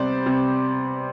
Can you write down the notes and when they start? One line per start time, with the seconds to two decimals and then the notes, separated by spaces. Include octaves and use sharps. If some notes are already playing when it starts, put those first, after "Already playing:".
Already playing: C3 G3 B3 C5 D5
0.26 C3